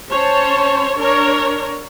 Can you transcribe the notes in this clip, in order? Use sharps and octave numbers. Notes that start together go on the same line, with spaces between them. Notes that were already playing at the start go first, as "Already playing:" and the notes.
C#4 C5 C#5 A5
D4 A#4 C#5